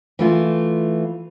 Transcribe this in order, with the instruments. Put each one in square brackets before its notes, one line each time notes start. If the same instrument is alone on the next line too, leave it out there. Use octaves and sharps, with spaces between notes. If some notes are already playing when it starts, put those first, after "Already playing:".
[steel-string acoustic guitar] E3 A3 F4